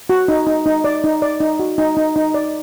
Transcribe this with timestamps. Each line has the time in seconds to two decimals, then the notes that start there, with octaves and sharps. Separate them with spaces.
0.09 F#4
0.28 D#4
0.47 D#4
0.66 D#4
0.84 D5
1.04 D#4
1.22 D5
1.40 D#4
1.59 F#4
1.78 D#4
1.97 D#4
2.16 D#4
2.34 D5